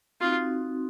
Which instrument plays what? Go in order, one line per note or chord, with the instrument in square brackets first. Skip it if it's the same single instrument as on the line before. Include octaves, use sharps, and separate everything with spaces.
[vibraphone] C4 D#4 F#4 [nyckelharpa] F4